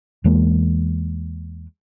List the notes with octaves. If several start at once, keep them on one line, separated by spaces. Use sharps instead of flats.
E2 E3 G#3 A#3